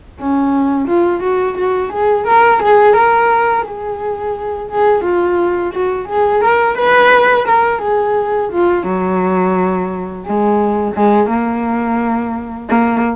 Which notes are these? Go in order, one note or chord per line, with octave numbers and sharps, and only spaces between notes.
C#4
F4
F#4
F#4
G#4
A#4
G#4
A#4
G#4
G#4
F4
F#4
G#4
A#4
B4
A#4
G#4
F4
F#3
G#3
G#3
A#3
A#3